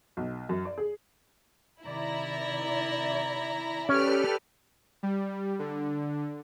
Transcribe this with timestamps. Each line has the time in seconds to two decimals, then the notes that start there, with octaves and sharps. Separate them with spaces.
0.17 B1
0.49 F#2
0.65 D5
0.78 G#4
1.83 C3 D#3 E4 D5 A#5
3.89 C#4 G4 A4 B4 D5 F6
5.03 G3
5.59 D3